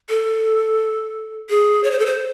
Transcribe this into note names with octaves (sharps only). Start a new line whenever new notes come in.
A4
G#4
C#5
C5
A4
C5